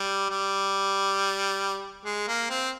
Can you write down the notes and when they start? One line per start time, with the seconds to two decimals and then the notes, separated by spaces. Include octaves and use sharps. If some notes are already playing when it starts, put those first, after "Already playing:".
Already playing: G3
0.30 G3
2.05 G#3
2.28 A#3
2.50 C4